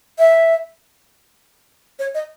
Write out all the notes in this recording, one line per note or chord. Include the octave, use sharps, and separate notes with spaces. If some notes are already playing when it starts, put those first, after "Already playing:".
E5
C#5
D#5